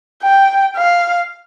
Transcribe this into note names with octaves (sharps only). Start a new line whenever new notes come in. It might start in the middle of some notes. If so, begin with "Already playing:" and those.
G5
F5